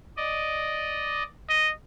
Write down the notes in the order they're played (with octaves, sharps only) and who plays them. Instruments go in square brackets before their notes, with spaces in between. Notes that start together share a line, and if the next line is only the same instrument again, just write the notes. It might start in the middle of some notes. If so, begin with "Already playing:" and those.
[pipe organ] D5 D#5
[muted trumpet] D#5